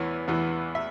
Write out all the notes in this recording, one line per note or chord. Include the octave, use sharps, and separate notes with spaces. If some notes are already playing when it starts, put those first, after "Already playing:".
Already playing: E2 E3 B3 C#5
E2 E3 B3
E5